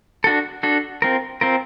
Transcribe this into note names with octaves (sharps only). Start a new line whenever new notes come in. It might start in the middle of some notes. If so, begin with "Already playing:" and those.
D4 F#4 A4
D4 F#4 A4
C4 F4 A#4
C4 F4 A#4